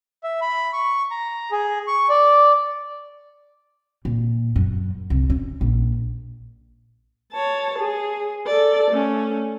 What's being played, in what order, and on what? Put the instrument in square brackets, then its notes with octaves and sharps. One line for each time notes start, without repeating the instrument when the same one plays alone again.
[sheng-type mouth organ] E5
B5
C#6
A#5
G#4
C#6
D5
[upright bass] A#2
F#2
C2
C#4
A#1
[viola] C#5 A5
G#4
A4 D5
A3 C#4